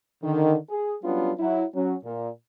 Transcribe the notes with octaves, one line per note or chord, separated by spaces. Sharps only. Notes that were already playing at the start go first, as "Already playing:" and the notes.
D3 D#3
G#4
F#3 G3 B3 C#4 D4 F4
F#3 E4
F#3 C#4
A#2